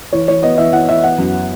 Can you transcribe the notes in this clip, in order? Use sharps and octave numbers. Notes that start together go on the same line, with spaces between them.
E3 C#5
E3 C#5
B3 D#5
E3 E5
E3 F#5
E3 E5
B3 F#5
F#2